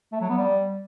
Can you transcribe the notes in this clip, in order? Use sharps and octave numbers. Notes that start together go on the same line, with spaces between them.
A3
F#3
B3
G3